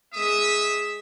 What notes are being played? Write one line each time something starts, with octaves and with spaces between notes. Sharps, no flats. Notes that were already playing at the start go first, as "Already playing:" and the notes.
G#3 E5 D#6